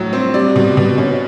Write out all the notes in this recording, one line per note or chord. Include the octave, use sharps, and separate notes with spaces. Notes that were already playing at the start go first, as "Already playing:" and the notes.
Already playing: A2 F#3
C4
G3 D5
B2
B2
C#4